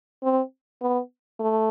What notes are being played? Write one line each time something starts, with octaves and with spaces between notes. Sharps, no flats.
C4
B3
A3